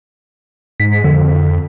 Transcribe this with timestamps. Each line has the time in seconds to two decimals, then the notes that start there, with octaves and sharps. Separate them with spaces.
0.80 G#2 B6
1.04 F2 D3